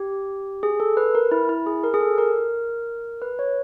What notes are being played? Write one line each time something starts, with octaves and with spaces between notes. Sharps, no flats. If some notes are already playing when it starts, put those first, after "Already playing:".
Already playing: G4
G#4
A4
B4
A#4
E4
E4
G#4
A#4
G#4
A4
A#4
B4
C#5